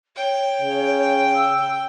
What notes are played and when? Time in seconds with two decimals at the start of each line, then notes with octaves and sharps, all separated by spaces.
0.16 C#5 G5
0.62 C#3
1.33 E6